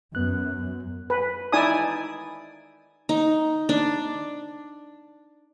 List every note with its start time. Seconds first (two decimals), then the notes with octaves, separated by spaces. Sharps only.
0.15 F#2 B3 F#6
1.10 B4
1.52 D#4 E4 D5 G#5 A5 D#6
3.09 D#4
3.69 D4